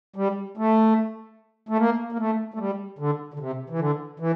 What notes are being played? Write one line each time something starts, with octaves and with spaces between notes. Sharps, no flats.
G3
A3
A3
A#3
A#3
A3
A3
G3
D3
D3
C3
E3
D3
E3